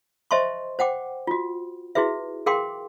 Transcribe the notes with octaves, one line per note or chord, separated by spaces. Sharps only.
C5 D#5 E5 A5 C6 C#6
C5 F#5 G5 D6
F4 F#4
E4 F#4 G#4 B4 E5
G#4 A#4 F5 G5 C6 D6